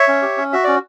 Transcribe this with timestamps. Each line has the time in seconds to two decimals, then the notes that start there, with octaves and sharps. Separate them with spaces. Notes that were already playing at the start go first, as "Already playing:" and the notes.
Already playing: C#5 E5
0.08 C#4
0.22 G4
0.38 C#4
0.53 F#4 E5
0.64 C#4 D5